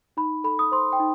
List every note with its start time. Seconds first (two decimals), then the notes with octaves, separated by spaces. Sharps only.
0.17 D#4 B5
0.44 A4 B5
0.59 D#6
0.72 C5 C6
0.93 G5
1.00 D#4